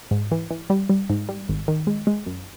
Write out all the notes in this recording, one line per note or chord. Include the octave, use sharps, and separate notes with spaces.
G#2
E3
E3
G3
G3
G#2
G3
G#1
D#3
G#3
G#3
F#2